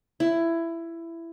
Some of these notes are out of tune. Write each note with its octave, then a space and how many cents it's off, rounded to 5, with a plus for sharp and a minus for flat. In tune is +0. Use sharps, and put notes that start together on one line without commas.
E4 +15